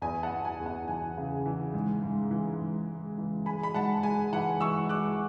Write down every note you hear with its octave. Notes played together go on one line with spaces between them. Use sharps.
E2 G#5
F#5 A5
E2
G#5
E2
F#5
E3 G#5
C#3
E3
G#2
G#2
E3
G#2
G#3
E3
G#3 G#5 B5
B5
G#2 F#5 A5
G#3 G#5
E3 F#5
E3 C#6 E6
G#3 D6 F#6